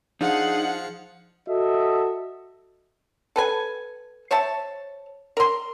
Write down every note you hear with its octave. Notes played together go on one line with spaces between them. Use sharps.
F3 D4 D#4 F4 G#4 F#5 C#7
F#4 A4 D#5 E5
A4 B4 G#5
C5 C#5 E5 A5
A#4 C6